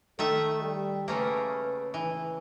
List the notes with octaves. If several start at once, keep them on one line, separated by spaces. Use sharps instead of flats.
D#3 A3 A4 E5
G3
C#3 A3 A#3 B4
E3